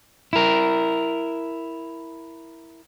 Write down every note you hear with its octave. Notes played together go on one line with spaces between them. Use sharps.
E4 A#4